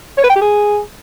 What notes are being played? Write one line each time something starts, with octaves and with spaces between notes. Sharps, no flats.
C#5
B4
G5
G4
G#4